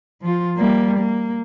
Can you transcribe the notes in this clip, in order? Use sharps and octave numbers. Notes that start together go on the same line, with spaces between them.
F3 F4
G3 A#3
A#3